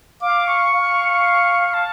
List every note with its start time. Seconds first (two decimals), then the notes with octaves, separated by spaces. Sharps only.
0.21 F5 D6
0.47 C#6
0.72 F5
1.74 A5